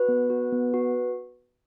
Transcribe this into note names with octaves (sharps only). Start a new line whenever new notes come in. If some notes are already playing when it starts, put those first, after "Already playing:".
Already playing: F#4 B4
B3
F#4
B3
F#4